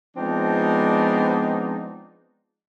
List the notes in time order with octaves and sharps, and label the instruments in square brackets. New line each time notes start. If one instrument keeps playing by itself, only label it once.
[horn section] F3 G#3 B3 C4 D4 D#4